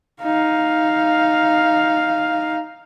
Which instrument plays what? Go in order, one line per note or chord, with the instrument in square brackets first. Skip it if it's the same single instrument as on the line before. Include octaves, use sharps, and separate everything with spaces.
[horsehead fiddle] D#4 F5